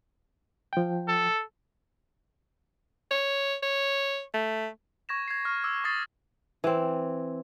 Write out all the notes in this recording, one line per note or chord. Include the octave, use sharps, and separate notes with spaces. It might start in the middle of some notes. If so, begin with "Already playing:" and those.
F3 G5
A4
C#5
C#5
A3
C#6 G#6 A#6 E7
G#6 C7
C#6 F6 C7
D6 E6
C#6 D#6 A6 C7
E3 C4